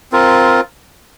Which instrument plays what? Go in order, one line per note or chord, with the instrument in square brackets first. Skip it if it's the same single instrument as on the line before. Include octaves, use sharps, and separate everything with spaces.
[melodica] C4 F4 A#4